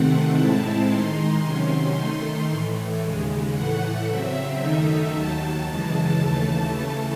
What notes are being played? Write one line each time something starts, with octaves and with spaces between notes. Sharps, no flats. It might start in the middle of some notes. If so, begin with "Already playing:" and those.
Already playing: C3 D#3 A3 C4 F#5
A2 G#3 C4 E4 A5
D#3 G#3 D#4 C6
C3 D#3 F#3 C#4
D#3 A3 D#4
A2 E3 A3
D#2 C#3 G#3
A2 E3 A3 F#5
C#3 F#3 C4 E5
F#2 D#3 A3 D#4 E5
D#2 D#3 F#3 A5
F#2 C#3 E3 G#3 A5
D#2 C#3 E3 A3
C#3 E3 A3 A5